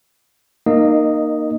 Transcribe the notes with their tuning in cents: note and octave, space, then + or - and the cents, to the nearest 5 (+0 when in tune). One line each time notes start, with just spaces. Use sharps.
A#3 +0 D#4 -25 D#5 +0